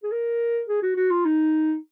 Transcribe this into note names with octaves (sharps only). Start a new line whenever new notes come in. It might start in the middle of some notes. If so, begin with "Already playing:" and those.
G#4
A#4
G#4
F#4
F#4
F4
D#4